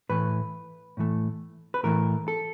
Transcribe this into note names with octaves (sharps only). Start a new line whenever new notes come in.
A2 E3 A3 B4
A2 E3 A3
B4
A2 E3 A3 A#4
A4